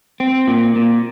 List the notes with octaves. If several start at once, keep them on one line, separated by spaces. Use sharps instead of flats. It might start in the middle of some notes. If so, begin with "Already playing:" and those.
C4
A#2
A#2